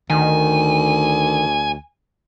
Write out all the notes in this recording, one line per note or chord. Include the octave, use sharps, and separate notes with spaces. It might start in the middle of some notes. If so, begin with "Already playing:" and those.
D2 D#3 G#5